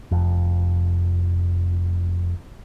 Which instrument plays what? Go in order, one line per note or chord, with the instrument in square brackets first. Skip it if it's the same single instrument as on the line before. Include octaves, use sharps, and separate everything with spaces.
[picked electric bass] F1 F2